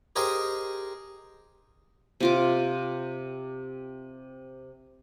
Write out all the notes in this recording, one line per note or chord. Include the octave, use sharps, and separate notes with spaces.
G4 G#4 A#4 C5 D#5 G5
C3 F4 D6